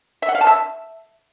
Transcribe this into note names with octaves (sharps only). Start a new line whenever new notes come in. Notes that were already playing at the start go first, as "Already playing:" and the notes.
E5
F#5
F5
A5
E5